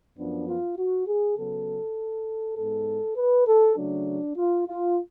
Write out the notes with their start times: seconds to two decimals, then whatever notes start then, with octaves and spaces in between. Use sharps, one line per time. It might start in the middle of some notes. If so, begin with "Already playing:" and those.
0.17 F#2 F3 B3 D4
0.47 F4
0.77 F#4
1.06 G#4
1.37 C#3 F#3 B3 A4
2.56 G#2 G#3 B3 A4
3.17 B4
3.46 A4
3.76 C#3 F#3 A3 D4
4.36 F4
4.67 F4